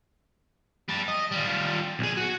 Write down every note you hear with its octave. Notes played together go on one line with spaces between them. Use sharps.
G3 A5
D#5
G3 F4
B1 G#4
F#4